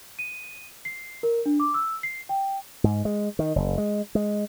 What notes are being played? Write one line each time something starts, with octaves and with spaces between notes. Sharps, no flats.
D#7
C7
A#4
D4
D6
E6
C7
G5
G#2
G#3
D#3
F#1
G#3
G#3